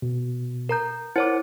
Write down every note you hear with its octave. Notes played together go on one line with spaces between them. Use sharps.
B2
A#4 A#5 G6
E4 A#4 C5 C#5 F#5 D6